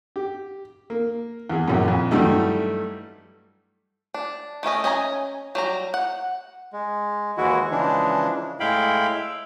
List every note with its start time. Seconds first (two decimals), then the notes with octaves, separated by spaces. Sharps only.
0.16 G4
0.90 A#3
1.50 E2 G#4
1.68 A#1 F#2
1.88 F2
2.11 G2 E3 F#3 G3 A3 D#4
4.14 D4
4.63 D#3 A3 C#4 D#5
4.84 C#4 D#5 G#5 A#5
5.55 F#3 G3 A#5
5.94 F#5
6.73 G#3
7.37 D#2 E3 G#3 E4 F#4
7.71 C#3 E3 F3 G#3 D4
8.60 A2 G#3 E4 F5 G5 B5
9.15 E5